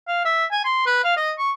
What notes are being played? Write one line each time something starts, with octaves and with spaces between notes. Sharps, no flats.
F5
E5
G#5
C6
B4
F5
D#5
C#6